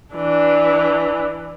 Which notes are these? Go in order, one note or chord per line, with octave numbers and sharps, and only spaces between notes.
E3 D4